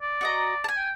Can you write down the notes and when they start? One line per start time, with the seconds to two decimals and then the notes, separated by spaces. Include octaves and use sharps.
0.01 D5
0.21 F#4 D#5 A#5
0.64 G#5 A5
0.76 G5